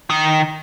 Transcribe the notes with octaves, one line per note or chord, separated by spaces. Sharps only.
D#3